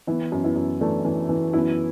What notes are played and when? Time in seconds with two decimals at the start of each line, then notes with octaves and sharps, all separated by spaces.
0.07 E3 B3 E4
0.32 F#2
0.44 B3 E4
0.56 F#2
0.81 E3 A3 D4
1.05 E3
1.29 E3
1.53 F#2 B3 E4